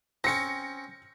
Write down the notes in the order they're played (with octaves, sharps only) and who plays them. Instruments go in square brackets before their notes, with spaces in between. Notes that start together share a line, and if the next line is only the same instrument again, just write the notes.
[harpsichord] C4 C#4 [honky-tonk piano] A#6 C#7